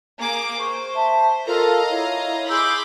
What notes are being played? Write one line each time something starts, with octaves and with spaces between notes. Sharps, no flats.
A#3 G#4 D6
C5 C#6
E5 A5
F4 A4 A#4 D#5 F5 A#5
E4 C#5
G#4 B5 C6 D6 E6 G6